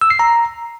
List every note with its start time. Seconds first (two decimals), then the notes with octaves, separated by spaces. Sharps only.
0.01 E6
0.10 C7
0.19 A#5